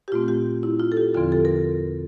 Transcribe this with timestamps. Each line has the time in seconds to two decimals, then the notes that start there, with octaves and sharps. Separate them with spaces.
0.08 G4
0.12 A#2 A3 C4 F4
0.28 G4
0.63 E4
0.80 F4
0.92 A4
0.97 G4
1.14 E2 D3 F3 C4 F4
1.32 A4
1.45 A#4